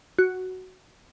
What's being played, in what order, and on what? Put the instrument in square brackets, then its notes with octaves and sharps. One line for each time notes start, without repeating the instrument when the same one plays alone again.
[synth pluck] F#4